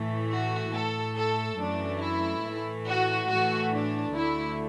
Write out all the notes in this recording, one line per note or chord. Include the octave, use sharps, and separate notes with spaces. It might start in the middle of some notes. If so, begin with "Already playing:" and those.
Already playing: A2 E3 A3
F#4
A2 A3 A4
A4
F#2 E3 A3 D4
E4
A2 E3 A3
F#4
A2 E3 A3 F#4
D4
D2 D3 A3 E4